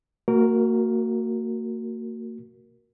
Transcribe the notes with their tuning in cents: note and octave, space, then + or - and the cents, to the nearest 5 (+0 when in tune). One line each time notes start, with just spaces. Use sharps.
A#3 -40 F#4 +0 A#4 +0